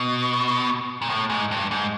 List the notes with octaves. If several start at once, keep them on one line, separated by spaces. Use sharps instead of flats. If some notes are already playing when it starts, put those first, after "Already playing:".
Already playing: B2
A#2
A2
G#2
G2
G#2